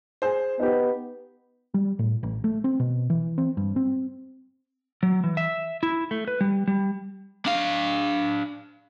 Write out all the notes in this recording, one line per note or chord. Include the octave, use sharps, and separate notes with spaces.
G#4 C5
B3 D#4 G4
G3
A2
A1
A3
C4
B2
E3
C4
G2
C4
F#3
E3
E5
E4
A3
B4
G3
G3
D4 F5